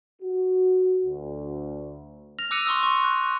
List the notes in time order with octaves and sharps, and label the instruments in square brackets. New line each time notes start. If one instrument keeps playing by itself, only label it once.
[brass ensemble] F#4
D2
[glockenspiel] F6 A#6 F7
D6 E6 F#6 A#6 C#7 D#7
C6 C#6 D#6 E6
C#6
F#6